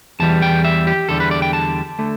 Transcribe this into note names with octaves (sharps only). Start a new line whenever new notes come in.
E2 E3 G3 A5
G5
E5
G4
E2 D3 G3 A4
B4
D5
G5
A5
D3 A3